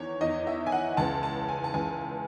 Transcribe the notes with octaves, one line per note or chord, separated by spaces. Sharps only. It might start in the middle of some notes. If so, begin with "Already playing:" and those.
Already playing: E2 D#3 C#5
E2 D#3 D#5
E5
G#5
F#5
C#2 C#3 E3 A5
A5
G#5
A5
C#2 C#3 E3 G#5